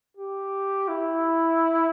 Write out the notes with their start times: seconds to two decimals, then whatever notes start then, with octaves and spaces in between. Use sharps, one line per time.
0.17 G4
0.88 E4